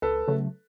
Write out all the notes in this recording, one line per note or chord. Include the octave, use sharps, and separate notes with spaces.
C#2 A4 B4
C#3 F#3 A3